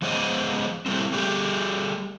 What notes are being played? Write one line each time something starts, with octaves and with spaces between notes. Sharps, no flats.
F3 G#3 B3 C5 D#5
G3 A3 C4
G3 A3 G4 G#4